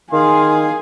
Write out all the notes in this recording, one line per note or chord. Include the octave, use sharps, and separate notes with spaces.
D#3 G#4 F5 G#5 C6